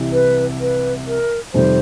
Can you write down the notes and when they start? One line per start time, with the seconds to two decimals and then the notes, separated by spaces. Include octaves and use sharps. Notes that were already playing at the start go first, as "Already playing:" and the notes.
Already playing: C2 C3 E3
0.12 B4
0.61 B4
1.07 A#4
1.54 F2 C3 D#3 G3 C5